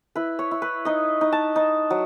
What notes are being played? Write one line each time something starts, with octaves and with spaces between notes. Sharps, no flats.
E4 B4
C#5
E4
B4
D#4 D#5
D#4
A5
D#4
F#3